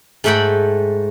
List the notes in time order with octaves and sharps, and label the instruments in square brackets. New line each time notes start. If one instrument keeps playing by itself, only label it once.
[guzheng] G#2 A3 E5 F#5 G5 B5